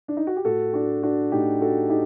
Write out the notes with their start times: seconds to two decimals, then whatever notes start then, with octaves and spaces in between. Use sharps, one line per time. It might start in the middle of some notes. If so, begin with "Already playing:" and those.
0.08 D4
0.17 D#4
0.27 F#4
0.36 G4
0.45 A2 F#4 A4
0.73 D4 F#4
1.03 D4 F#4
1.32 A2 D#4 G4
1.62 F#4 A4
1.89 D#4 G4